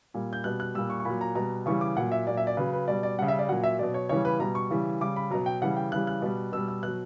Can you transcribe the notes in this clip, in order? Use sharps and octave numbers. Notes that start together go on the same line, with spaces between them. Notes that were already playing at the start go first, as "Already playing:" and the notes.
A#2 G3
G6
B2 G3 F#6
F#6
A#2 G3 E6
C#6
C#6
A#2 F#3 B5
A#5
B2 G3 A#5
C#3 E3 G3 C#6
D6
A#2 F#3 F#5
E5
A#2 F#3 D5
E5
D5
C#3 F#3 B4
B4
B2 G3 D5
D5
C#3 G3 F#5
E5
D5
A#2 F#3 F#5
E5
B2 F#3 D5
C#5
C#3 E3 G3 C#5
B4
B2 G3 A#5
C#6
C#3 E3 G3
C#3 G3 D6
B5
B2 F#3 A#5
G5
C#3 E3 G3 F#5
G5
C#3 E3 G3 F#6
F#6
B2 G3
B2 G3 E6
E6
B2 F#3 F#6